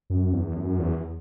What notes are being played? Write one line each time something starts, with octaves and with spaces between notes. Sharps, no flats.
F#2
E2
F#2
E2